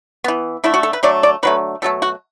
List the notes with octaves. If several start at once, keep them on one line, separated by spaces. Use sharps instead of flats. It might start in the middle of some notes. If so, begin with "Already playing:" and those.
E3 B3
D3 A3 E4
F#4
A4
B4
D3 F#3 A3 D5
D5
D3 F#3 A3 B4
B2 F#3 A3 A4
F#4